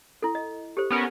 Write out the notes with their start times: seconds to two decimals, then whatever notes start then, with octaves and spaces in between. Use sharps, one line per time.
0.22 E4 A4
0.35 D#5
0.77 G4 A4 C5
0.90 B3 C#4 A#4